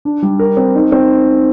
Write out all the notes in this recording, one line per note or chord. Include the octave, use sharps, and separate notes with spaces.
D4
G3
A#4
C4
D#4
C4